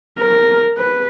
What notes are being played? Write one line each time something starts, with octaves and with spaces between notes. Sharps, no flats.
A#4
B4